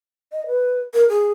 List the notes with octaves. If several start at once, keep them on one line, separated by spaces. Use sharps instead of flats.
D#5
B4
A#4
G#4